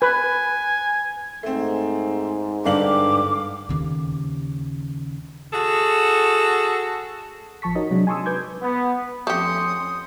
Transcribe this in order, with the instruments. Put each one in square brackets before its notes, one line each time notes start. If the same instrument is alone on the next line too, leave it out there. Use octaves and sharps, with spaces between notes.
[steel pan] B4 [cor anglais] G#5
[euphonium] G#2 [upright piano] A3 C4
[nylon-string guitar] G2 D4 [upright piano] D3 F5 F#7 [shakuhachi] D6
[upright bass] D#2 C#3
[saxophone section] F#4 G#4 A4
[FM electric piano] A1 F3 A5 C#6 B6
D#4 F#4 A#4 C#5 D#5
C3 F#3 G#3 D4
G#5 A5 C6 C#6 D#6 E6
B4 D6 G6 G#6
[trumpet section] B3
[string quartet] F2 C#4 C6 [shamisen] A3 G4 [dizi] D#6 [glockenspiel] G6 C#7